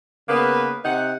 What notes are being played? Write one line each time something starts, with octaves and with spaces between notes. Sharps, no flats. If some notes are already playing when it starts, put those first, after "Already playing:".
C#3 A#3 B3 B4
C3 D#4 F#5